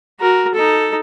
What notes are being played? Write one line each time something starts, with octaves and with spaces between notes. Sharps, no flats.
F#4 A#4
D#4 A4